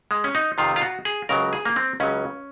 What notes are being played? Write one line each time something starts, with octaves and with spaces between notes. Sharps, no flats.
G#3
C#4
D#4
F2 C3 D#3 F4
F4
F#4
G#4
C#2 C#3 F#3 A#4
G#4
A#3
C4
C#2 C#3 F#3 C#4